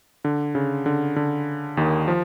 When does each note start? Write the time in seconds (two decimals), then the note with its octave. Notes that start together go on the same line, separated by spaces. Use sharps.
0.25 D3
0.55 C#3
0.86 D3
1.16 D3
1.77 D#2 D#3
2.08 F3